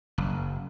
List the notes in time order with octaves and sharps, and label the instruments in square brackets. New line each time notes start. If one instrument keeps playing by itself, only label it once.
[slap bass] F#1